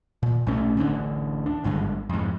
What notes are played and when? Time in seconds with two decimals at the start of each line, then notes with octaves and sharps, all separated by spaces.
0.23 A#2
0.47 B1 A2 A3 C#4
0.77 A1 D2 D3 D4
1.46 D4
1.64 G#1 G2 D3 G#3
2.10 F2 G#2